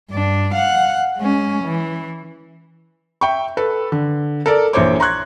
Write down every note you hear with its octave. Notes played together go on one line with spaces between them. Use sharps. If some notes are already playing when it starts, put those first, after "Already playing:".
G2 D4
F5 F#5
G#3 C#4
E3
E5 G5 C#6
A4 B4
D3
A4 A#4 D5
A#1 E3 C5 C#5 D6
A#5 C6 C#6 F#6 G#6